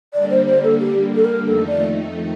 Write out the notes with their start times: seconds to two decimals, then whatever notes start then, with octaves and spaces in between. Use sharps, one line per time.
0.13 D3 G3 A#3 D5
0.30 C5
0.47 C5
0.63 A4
0.79 G4
1.15 A4
1.24 A#4
1.46 F2 D#3 A3 D#4 A4
1.67 D5